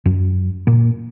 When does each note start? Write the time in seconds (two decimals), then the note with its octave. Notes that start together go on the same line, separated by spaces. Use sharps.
0.06 F#2 F#3
0.67 A#2 A#3